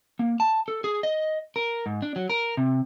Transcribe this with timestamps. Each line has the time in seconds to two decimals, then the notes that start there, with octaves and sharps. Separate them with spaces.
0.19 A#3
0.40 A5
0.68 A4
0.84 G#4
1.03 D#5
1.56 A#4
1.86 G#2
2.02 D4
2.16 F#3
2.30 A#4
2.57 C3